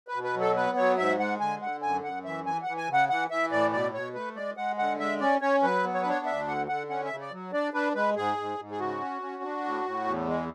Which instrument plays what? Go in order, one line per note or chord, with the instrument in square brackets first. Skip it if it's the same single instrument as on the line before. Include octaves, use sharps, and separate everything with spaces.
[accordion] B4
B2
B4
F#3
A4
B3 B4
F#3 C#5
G#2 E5
G#3 F#5
D3 G#5
D3 F#5
F#2 G#5
F#2 F#5
E3 E5
E3 G#5
F#5
E3
G#5
C#3
F#5
E3 F#5
E3 E5
A2 D5
B2 D5
B2 C#5
A3 B4
G#3 D5
G#3 F#5
D3 F#5
G#3 E5
C#4 D5
C#4 C#5
F#3 B4
B3
C#5
B4
D4 C#5
D2 E5
D3 F#5
D3 F#5
C#4 F#5
E5
C#3
D5
F#3
D4 D5
D4 B4
G#3 B4
G#2 G#4
G#2
G#2
G#4
C#3 F#4
C#4
C#4
D4
A2
A2
E2
G#3